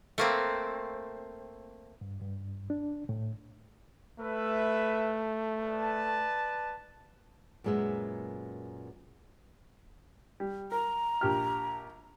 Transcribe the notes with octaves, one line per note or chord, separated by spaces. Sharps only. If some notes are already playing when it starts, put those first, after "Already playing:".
A3 A#3 C4
G2
G2
D4
A2
A3 B4 E5
B4 D5 A5
F#2 A#2 G#3 B3 E5
G3
A#4 A#5
A#1 G4 F6